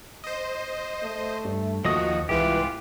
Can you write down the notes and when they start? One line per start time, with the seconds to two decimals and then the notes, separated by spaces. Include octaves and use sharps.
0.24 C5 D#5
1.03 A3
1.45 G2
1.85 D#2 D#3 F3 F#4 D#5 D#6
2.29 C2 G#2 E3 F4 G4 B4